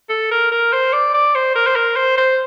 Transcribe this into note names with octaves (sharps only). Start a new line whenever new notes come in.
A4
A#4
A#4
C5
D5
D5
C5
A#4
C5
A#4
C5
C5